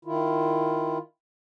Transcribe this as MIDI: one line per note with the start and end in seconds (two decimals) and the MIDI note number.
0.05 0.98 51
0.05 0.98 64
0.05 0.98 65